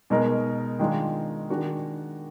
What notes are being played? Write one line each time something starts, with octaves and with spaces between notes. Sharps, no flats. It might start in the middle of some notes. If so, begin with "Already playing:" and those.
B2 G#3 D#4 A#4
D#3 G#3 D4 F4
D#3 G#3 D4 F#4 A#4